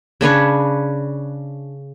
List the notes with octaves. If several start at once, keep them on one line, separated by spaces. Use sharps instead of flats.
C#3 D4 B4 C#5